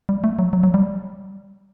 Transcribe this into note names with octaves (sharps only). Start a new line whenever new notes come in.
G3
A3
F#3
F#3
F#3
G3